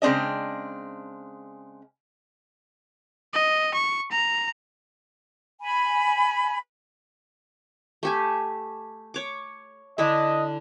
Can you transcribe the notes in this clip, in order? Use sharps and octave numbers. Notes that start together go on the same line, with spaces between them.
C#3 G#3 C4 D4 D#5
D#5
C#6
A#5
G#5 B5
A3 G4 G#5
C#5 D6
D3 D4 E4 D#5